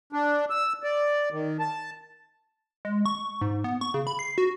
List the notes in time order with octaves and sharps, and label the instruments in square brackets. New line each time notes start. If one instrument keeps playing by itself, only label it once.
[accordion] D4
E6
D5
D#3
A5
[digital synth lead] G#3
C#6
G#2
B3
C#6
C#3
B5
C7
F#4